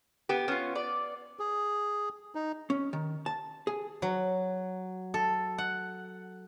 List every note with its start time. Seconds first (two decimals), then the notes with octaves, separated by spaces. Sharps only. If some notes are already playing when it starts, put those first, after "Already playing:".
0.29 B3 G4
0.48 B3 C#4 F4
0.75 D5
1.39 G#4
2.35 D#4
2.70 C#4
2.93 D#3
3.26 A5
3.67 G#4
4.02 F#3
5.14 A4
5.58 F#5